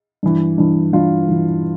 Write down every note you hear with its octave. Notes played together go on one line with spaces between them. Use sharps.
G2 E3
G2 E3
G2 E3 F4
G2 E3